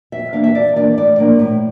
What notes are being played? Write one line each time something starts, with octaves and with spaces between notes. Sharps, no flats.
F2 E5
E3 A#3 D4 F5
E5
F2 D5
E3 A#3 D4 D5
A2 D5
F3 A#3 D4
A2